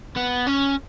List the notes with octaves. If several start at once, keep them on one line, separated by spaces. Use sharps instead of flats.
B3
C#4